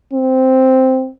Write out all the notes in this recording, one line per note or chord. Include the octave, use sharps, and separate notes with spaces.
C4